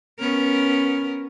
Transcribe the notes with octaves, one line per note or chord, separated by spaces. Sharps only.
B3 C#4 A#4